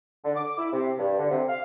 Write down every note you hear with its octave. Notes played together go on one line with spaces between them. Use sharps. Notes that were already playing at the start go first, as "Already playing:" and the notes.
D3
D6
E4
C3
G2
D3
C3
F5